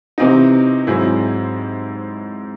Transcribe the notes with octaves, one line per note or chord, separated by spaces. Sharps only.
C3 E3 C4 D#4
G#2 F#3 C4 E4 G#4